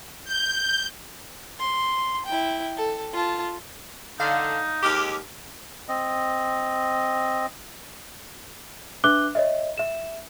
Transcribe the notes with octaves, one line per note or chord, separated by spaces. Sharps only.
G6
C6
E4 G5
A4
F4 A5
D3 D#4 F5
D#2 G#3 G4 D6 F6
C4 D#5
D4 B4 E5 D6 F#6 G7
C#5 D#5 E5
E5 E7